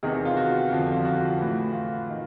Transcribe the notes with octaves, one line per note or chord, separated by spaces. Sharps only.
E2 C3 D#3 G#4
F4
F#4
F2 D3 F3
F4
F#4
A2 E3
F4
D#3